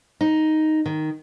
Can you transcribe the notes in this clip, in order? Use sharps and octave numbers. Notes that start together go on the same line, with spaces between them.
D#4
D#3